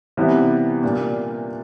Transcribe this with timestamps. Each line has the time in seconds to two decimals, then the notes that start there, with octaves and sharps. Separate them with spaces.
0.17 C3 E3 G3 B3 E4
0.83 A#2 G3 A#3 D4